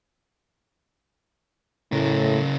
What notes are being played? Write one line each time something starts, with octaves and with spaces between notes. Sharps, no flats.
A2 C#3 A#4